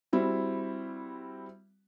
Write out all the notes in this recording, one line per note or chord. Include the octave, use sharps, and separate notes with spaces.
G3 C4 E4 F#4